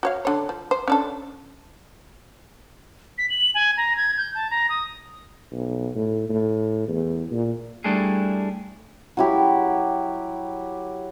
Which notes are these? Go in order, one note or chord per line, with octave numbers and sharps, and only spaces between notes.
F#4 C#5 F5
D3 C#5
F3
C5
C#4 D4 A4
B6
F#7
G#5
A#5
G#6
G6
A5
A#5
D#6
B1
A2
A2
E2
A#2
G3 A3 D4 E4 G#4
F#3 E4 G4